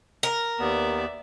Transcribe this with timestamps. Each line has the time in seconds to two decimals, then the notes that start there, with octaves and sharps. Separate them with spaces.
0.23 A#4
0.60 D#2 B3 D5 E5